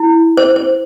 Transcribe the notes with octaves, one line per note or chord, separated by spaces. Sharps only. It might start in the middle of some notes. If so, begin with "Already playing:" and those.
Already playing: E4
C5
C5